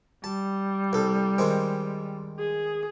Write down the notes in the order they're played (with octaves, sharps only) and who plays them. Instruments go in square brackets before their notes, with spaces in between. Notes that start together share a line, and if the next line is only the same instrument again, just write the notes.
[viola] G3 [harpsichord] A5
[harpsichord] C2 A4
D#3 G#3 C4
[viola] G#4